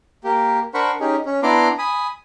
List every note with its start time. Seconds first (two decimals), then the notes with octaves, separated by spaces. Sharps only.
0.24 A#3 G4
0.74 D4 A#4 C5 F#5 B5 C#6
1.00 C#4 D#4 G4 G#4
1.26 C#4
1.43 B3 D4 E4 A#5 C6 D6
1.79 G#5 B5 D#6